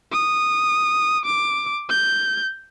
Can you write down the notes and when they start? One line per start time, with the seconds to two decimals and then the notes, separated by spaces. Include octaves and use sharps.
0.12 D#6
1.25 D6
1.90 G6